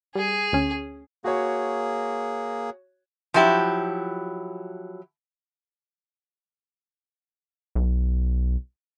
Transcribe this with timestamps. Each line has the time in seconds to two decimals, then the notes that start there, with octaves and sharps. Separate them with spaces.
0.15 G3 G#4
0.52 D2 C#4
1.24 A#3 F#4 G#4 C#5
3.34 F3 F#3 E4 G4
7.75 B1